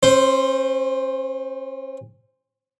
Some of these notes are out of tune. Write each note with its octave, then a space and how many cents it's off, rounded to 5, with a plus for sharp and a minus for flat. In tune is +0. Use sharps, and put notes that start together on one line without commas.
C#4 -40 C5 +0